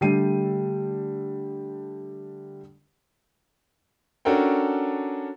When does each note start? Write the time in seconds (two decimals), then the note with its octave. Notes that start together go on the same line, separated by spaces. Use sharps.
0.01 D3 G3 A3 G5 C7 D#7
4.25 C#4 D4 F#4 A4 A#4 G5